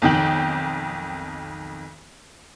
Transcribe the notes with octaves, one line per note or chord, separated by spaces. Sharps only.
B1 F2 D#3 G5 F#7